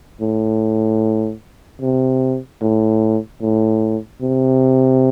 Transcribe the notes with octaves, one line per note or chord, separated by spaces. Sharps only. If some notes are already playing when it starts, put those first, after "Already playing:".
A2
C3
A2
A2
C3